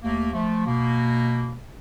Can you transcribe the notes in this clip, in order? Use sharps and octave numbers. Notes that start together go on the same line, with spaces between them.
D#2 A3 A#3
F3 A3
B2 A#3